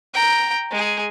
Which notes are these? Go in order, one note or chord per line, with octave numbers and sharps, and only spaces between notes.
G5 A#5
G#3 G#4